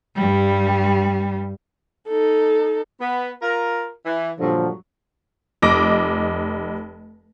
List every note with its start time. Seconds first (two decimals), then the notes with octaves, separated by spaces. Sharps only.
0.16 G2 G3
2.08 D#4 A4
3.00 B3
3.41 F4 A#4
4.06 E3
4.39 G2 A#2 D3 F3 F#3
5.62 F1 D#5 D6 A#6 D7